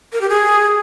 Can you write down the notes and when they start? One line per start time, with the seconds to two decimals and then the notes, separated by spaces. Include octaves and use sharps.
0.13 A#4
0.21 G4
0.30 G#4